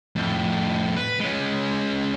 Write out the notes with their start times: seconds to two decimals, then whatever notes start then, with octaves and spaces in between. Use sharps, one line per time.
0.16 F2 A2
0.96 B4
1.20 G#3 C#4